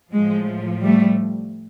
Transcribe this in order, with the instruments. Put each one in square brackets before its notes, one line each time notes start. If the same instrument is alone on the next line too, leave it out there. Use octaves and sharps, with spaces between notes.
[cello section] A2 F3 G#3
G3 A3